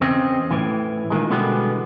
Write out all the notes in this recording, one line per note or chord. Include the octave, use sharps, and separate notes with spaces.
E2 C#3 C4 D#5
A2 E3
A#2 D#3 G#3
B2 D3 E3 G3 G#3 B3